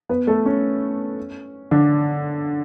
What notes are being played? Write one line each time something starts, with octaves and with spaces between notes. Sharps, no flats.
B3 B4
A3 A4
C#4
D3 D4